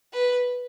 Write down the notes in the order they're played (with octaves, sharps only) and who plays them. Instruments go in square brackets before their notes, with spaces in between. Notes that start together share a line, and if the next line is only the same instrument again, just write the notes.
[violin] B4